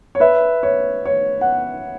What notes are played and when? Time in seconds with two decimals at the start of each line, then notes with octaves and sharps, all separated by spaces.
0.15 C#5
0.20 B4 E5
0.63 C#5
1.05 C#5
1.41 F#5